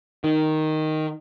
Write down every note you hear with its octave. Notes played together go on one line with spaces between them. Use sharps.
D#3